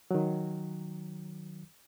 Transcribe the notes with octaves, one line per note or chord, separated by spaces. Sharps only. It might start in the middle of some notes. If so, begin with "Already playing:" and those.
D#3 F#3